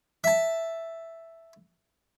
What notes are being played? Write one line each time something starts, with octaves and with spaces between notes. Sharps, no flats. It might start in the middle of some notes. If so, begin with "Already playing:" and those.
E5 A5